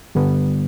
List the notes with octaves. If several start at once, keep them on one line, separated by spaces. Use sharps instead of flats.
G2 D3 G3 B3